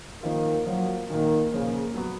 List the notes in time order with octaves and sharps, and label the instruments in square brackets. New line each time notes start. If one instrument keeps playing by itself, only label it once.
[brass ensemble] D#3 [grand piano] F3 A#3 F4
[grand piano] F3 A#3 F4 [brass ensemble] F#3
[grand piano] A#2 F3 A#3 [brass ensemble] D#3
[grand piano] A#2 F3 A#3 [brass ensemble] C#3
[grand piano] F#3 B3 F#4